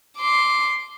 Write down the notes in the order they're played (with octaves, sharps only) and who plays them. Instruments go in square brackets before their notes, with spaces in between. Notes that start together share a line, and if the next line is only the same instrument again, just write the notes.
[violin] C6 D6